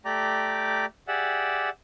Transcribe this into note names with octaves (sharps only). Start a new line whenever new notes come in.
A3 G4 D5 G5 A#5 D6
G4 G#4 D5 E5 F#5